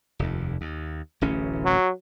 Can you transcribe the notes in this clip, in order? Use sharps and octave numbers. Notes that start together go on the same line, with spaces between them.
F1 D#2
D#2
D1 A1 C#4
F#3